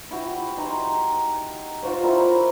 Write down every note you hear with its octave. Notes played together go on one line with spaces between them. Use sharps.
E4 F#4 G4
D#4 A#5 C6
F4 F#4 C5 C#5
E4 A#4 D5 E5